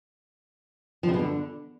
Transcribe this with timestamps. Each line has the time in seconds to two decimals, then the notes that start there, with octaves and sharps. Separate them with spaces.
1.03 F3
1.09 C#3
1.14 B2
1.19 D3